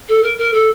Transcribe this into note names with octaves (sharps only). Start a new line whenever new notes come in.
A4
A#4
A#4
A4